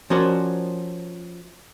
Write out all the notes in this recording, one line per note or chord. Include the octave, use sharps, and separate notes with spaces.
F3 C#4 F#4 A#4 C5 D5